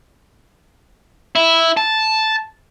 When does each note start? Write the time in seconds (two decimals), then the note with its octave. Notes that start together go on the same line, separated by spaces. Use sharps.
1.35 E4
1.77 A5